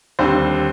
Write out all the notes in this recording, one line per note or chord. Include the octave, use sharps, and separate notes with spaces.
D#2 D3 G3 C4 C5